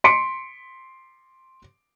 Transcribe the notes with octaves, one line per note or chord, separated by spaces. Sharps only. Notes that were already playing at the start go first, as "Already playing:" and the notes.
C6 B6 C#7 D7